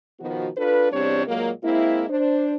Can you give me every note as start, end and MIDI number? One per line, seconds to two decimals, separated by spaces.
0.20 0.48 47
0.20 0.48 51
0.20 0.48 53
0.20 0.48 59
0.20 0.48 66
0.57 0.86 62
0.57 0.86 65
0.57 0.86 69
0.57 0.86 71
0.92 1.25 40
0.92 1.25 48
0.92 1.25 55
0.92 1.25 60
0.92 1.25 62
0.92 1.25 73
1.26 1.51 46
1.26 1.51 54
1.26 1.51 56
1.26 1.51 58
1.63 2.04 56
1.63 2.04 58
1.63 2.04 60
1.63 2.04 64
2.09 2.55 62
2.09 2.55 72